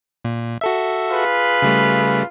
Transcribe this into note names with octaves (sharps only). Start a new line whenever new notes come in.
A#2
F#4 A4 E5
F4 G#4 B4
C#3 G3 A3